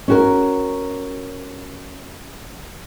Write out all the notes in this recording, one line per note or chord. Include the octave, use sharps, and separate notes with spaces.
C#4 F#4 A#4